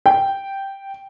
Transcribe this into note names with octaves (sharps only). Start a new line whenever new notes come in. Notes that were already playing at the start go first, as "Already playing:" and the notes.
G5